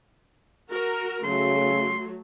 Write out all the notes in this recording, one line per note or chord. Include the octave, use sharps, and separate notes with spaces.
F#4 A#4
C#3 F#3 A3 C6